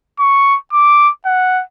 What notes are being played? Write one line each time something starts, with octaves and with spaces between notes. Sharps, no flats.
C#6
D6
F#5